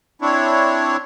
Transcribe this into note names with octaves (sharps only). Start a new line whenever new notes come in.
C4 D4 E4 C#5